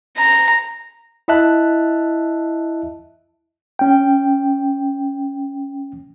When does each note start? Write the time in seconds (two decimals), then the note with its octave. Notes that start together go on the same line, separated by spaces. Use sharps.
0.17 A#5
1.28 E4 D#5 E5 A5 F#6
3.79 C#4 G5